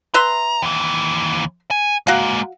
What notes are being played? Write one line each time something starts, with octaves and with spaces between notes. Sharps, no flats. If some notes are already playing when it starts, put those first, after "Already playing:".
B4 E5 A#5 C6
D#2 E3
G#5
G#3 A#3 F#4 F5